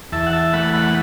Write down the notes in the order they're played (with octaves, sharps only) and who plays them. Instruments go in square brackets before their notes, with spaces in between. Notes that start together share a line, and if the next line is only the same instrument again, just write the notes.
[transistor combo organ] E2 E5 A5
F#5
E5 A5
A3 F#5 B5
F#5 B5